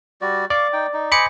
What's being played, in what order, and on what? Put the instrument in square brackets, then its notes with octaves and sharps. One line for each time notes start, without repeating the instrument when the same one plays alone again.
[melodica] G3 F#4 D5
[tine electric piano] D5 [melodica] F5 C#6 D6
[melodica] D#4 G5
D#4
[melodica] C5 D#5 G#5 [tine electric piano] B5 D6 C#7